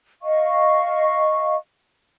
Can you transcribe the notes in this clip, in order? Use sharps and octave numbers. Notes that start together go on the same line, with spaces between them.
D#5 F5 C#6